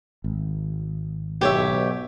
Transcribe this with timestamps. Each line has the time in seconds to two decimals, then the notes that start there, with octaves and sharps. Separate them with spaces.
0.24 G#1
1.41 B1 G4 C#5 E5